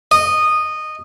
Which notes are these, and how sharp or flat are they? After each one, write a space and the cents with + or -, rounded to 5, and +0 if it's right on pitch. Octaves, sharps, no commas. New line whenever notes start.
D#5 -15